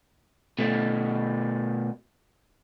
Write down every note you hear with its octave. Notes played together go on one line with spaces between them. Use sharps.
B2 A3